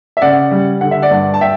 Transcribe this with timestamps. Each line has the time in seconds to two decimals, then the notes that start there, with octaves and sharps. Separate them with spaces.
0.17 E5
0.21 C#3 D5 F#5
0.51 G3
0.81 D3 F#5
0.91 E5
1.02 D5 F#5
1.11 G2
1.34 A5
1.41 E5 G5